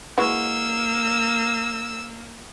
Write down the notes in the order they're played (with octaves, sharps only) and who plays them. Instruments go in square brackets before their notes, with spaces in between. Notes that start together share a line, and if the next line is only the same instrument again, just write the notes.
[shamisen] E3 G#3 F#4 [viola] A#3 [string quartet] E6